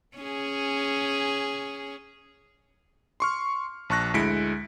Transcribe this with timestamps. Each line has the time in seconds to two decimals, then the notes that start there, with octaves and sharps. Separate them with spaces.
0.17 C#4 G#4
3.20 C6 C#6 F6
3.90 A#1 A5 C#6 F#6 A#6
4.14 D2 G#3 E4 B6 C#7 D7